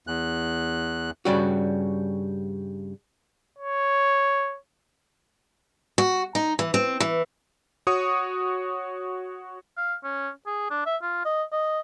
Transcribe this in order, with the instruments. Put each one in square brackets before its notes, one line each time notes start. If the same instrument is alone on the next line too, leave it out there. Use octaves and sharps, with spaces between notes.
[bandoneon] E2 F#6
[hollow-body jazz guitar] G2 C#3 G3 F#4
[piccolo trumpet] C#5
[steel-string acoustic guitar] F#4
D#4
E3
C4
E3
[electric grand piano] F#4 C#5 C#6 D#6
[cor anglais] F5
C#4
G#4
D4
E5
F4
D#5
D#5